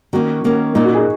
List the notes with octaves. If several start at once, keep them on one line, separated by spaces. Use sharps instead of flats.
D#3 A#3 C#4 F#4
D#3 A#3 C#4
A#2 A#3 C#4 D#4
F#4
D#4 G#4